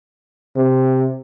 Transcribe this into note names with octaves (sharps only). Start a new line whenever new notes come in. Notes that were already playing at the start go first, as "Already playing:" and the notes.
C3